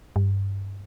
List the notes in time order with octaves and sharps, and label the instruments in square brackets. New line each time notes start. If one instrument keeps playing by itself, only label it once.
[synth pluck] G2